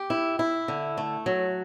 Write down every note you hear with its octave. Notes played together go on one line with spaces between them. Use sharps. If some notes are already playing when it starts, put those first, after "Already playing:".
Already playing: G4
E4
E4
D3
A3
F#3